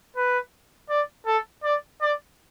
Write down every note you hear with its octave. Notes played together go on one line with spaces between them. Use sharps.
B4
D5
A4
D5
D5